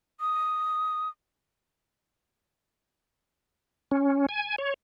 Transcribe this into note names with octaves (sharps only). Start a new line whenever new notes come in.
D#6
C#4
G#5
C#5